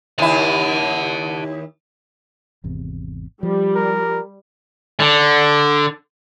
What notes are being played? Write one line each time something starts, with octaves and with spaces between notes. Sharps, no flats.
D#2 E4 F#5 A5
G#1 E2 C3
F3 G3
A#4
D3